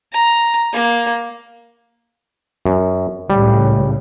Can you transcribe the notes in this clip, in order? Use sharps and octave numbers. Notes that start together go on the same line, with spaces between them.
A#5
A#3
F#2
C#2 A2 C#3 G3